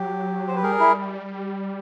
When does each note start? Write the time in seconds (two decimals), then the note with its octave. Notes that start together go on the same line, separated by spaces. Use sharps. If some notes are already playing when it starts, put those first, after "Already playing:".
Already playing: F#3 G4
0.47 C5
0.56 B4
0.63 G3 G#4 A#4
0.80 E4